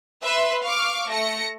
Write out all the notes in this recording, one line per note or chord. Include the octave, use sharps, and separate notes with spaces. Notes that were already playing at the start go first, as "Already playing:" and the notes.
B4 E5 C6
F5 C#6 D6 F6
A3 A#6 C#7